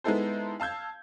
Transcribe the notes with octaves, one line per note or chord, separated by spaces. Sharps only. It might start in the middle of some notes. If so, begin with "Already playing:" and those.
G#3 B3 D#4 E4 A4 C5
F5 A5 E6 G6 G#6